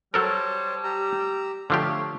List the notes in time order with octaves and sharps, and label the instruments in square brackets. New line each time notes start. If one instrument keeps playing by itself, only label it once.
[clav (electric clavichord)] F#3 A4 A#4 [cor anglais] G3 [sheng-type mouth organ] C5 C#5 A5
[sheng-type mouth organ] G4 A#5 E6
[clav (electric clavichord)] D3 F3 G4 [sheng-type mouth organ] A3 F5 C6 [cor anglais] C#5